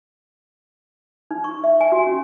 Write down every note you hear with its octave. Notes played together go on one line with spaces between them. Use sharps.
D#4
C#6
E5
G#5
F#4
C#4